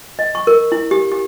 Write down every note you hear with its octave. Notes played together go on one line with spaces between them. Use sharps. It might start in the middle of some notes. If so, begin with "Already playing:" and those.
D#5
C#6
A#4
E4
G4
G4